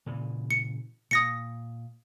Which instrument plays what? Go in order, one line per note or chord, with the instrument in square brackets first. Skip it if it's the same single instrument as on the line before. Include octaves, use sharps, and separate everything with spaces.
[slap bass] A#2 C#3 E3
[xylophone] C#7
[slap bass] A#2 [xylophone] D#6 A#6 C#7